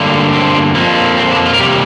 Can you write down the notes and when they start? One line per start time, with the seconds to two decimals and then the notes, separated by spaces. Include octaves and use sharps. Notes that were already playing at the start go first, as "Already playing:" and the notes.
Already playing: G2 D3 A#3
0.33 C4
0.75 F2 F3 A#3
1.17 C4
1.32 D4
1.46 F4
1.54 A#4
1.60 C3 G3 A#3 G4